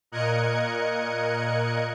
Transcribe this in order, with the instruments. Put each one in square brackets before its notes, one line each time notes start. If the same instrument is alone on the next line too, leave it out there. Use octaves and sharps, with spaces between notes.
[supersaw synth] A#2 A#4 D#5 F#6 G#6 C#7